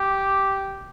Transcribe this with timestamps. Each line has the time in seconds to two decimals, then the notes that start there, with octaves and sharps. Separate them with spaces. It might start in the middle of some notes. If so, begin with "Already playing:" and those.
Already playing: G4